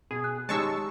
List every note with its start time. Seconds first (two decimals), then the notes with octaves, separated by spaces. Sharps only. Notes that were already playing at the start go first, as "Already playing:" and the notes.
0.11 B2 G#4
0.24 F#6
0.49 D#3 G3 G#3 C#5 A5 C#6 E6